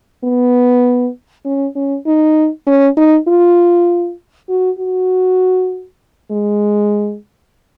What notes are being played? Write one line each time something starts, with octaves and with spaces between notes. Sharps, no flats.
B3
C#4
C#4
D#4
C#4
D#4
F4
F#4
F#4
G#3